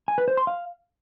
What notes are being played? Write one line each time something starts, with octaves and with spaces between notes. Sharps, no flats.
G#5
B4
C5
C6
F5